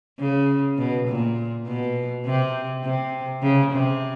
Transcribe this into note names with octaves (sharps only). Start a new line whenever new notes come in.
C#3
B2
A#2
B2
C3
C3
C#3
C3